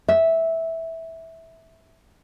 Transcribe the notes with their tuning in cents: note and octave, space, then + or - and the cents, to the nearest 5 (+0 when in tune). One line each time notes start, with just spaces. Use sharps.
E5 -10